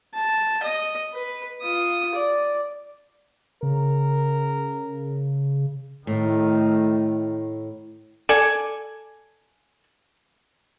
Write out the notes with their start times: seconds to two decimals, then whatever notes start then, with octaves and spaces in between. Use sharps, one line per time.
0.14 A5
0.63 D#5
1.14 B4
1.61 F4 D#6
2.15 D5
3.63 C#3 A#4
6.07 A2 D#3 A3
8.29 A4 D5 G#5